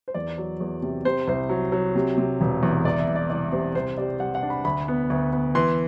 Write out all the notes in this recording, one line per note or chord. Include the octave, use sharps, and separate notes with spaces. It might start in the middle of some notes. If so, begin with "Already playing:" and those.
C5
E2 D5
F#3
E2
C3
C3 C5
C2 C5
F#3
F#3
C3
C3
E1
E2
C2 D5
E5
C2
D5
C2 D5
C3 C5
C2 C5
G3 D5
G3 F#5
F#5
D4
B5
D2 B5
B3
D2
B3
E3 C6